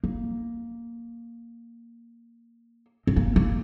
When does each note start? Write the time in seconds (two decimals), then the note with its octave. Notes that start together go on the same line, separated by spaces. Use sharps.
0.04 A#3
3.07 C4
3.16 A#3
3.36 A#3